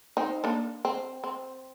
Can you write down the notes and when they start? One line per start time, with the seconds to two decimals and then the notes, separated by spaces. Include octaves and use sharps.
0.17 C4 D#4
0.44 A#3 D4
0.85 C4
1.24 C4